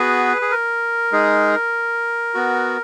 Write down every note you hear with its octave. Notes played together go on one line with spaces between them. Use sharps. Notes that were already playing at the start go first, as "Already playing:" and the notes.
Already playing: B3 F#4 G#4 B4
G#4
A#4
G#3 D#4 G#4
B3 F#4